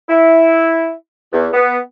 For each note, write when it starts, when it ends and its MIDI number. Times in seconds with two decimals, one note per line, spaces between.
0.09 0.90 64
1.32 1.47 40
1.53 1.78 59